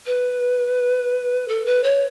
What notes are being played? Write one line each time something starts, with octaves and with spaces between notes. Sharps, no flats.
B4
A4
B4
C#5